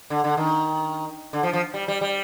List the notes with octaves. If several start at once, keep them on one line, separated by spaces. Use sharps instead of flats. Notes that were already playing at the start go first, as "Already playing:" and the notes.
D3
D3
D#3
D3
F3
F3
G3
G3
G3